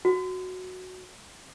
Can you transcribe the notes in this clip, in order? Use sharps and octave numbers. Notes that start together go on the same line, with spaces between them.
F#4